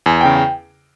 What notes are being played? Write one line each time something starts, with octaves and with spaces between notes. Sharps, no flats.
E2 G#5
C#3 G5
G5